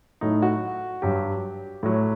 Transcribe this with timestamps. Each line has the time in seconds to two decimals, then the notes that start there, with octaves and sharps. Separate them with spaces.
0.21 A2 F#3 D#4
0.42 F#4
1.02 G2 F#3 G4
1.83 A2 F#3